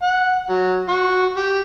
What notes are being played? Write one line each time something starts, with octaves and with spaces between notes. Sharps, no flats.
F#5
F#3
F#4
G4